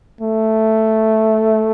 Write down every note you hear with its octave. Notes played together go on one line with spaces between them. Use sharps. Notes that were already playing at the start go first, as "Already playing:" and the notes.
A3